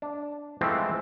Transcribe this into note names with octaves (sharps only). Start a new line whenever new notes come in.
D4
E3 F3 G#3 A3 C4